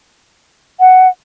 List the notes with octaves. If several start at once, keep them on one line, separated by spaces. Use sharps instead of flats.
F#5